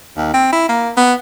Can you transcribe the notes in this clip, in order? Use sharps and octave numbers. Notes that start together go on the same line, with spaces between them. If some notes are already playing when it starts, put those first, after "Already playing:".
D#2
C4
E4
A#3
B3